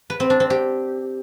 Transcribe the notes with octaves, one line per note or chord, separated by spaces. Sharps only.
B4
C4
D4
C4
G4